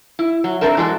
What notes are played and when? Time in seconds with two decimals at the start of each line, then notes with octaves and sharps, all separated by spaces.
0.19 E4
0.44 F#3
0.61 C4 D4 A4 A#4 E5
0.77 E3 G#3 D4 F#4 A4